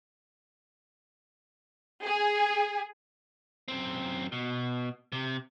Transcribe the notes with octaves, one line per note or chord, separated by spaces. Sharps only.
G#4
F#2 C4
B2
C3